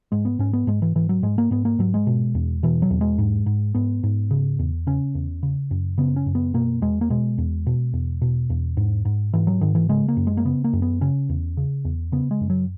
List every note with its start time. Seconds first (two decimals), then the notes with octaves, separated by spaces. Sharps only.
0.12 G#2 G#3
0.25 B3
0.39 G#2 C#4
0.53 B3
0.67 G#2 G#3
0.82 E3
0.95 G#2 E3
1.09 F#3
1.23 G#2 G#3
1.38 A#3
1.51 G#2 B3
1.65 A#3
1.79 G#2 F#3
1.94 G#3
2.07 B2
2.35 E2
2.63 B2 E3
2.82 F#3
2.90 E2
3.01 G#3
3.18 G#2
3.46 G#2
3.75 G#2 B3
4.03 G#2
4.31 C#3
4.59 E2
4.87 C#3 C#4
5.15 E2
5.43 C#3
5.71 F#2
5.98 C#3 B3
6.16 C#4
6.26 F#2
6.35 B3
6.54 B2 A#3
6.82 E2 G#3
7.01 A#3
7.10 B2 G#3
7.38 E2
7.67 B2
7.93 E2
8.22 B2
8.50 E2
8.77 G#2
9.05 G#2
9.33 G#2 E3
9.47 F#3
9.61 G#2 D#3
9.75 E3
9.89 C#3 G#3
10.08 A#3
10.17 F#2
10.27 G#3
10.37 A#3
10.45 C#3 B3
10.64 A#3
10.73 F#2
10.82 B3
11.01 C#3 C#4
11.29 E2
11.57 C#3
11.85 E2
12.12 C#3 B3
12.31 G#3
12.41 F#2
12.50 F#3